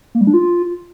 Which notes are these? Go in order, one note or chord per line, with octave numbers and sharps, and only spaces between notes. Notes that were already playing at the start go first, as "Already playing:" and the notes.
A#3
G3
D4
F4